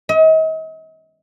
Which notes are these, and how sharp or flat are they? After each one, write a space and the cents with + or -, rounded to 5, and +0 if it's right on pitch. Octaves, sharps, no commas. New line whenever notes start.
D#5 +40